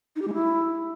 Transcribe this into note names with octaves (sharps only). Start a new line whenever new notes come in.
D#4
G4
G#3
E4